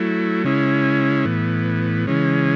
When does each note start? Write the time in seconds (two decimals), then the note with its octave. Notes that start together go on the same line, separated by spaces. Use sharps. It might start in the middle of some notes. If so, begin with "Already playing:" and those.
Already playing: F#3 A3 E4
0.44 C#3 G#3 C#4 E4
1.26 A2 E3 B3
2.07 C#3 E3 G#3 C#4